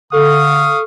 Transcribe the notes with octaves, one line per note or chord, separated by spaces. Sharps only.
D3 A4 F5 C#6 D#6